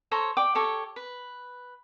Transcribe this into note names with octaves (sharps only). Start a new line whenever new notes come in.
A4 C5 C#5 A#5
D5 G5 D6
G4 A4 C#5 A#5
B4